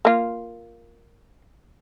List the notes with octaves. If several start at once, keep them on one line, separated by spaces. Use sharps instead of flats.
A#3 F4